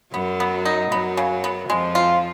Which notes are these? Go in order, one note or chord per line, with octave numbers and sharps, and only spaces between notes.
F#2 F#3 B3
B3
D#4
F#2 F#3 B3
C#3
B3
F2 F3 G#3
F4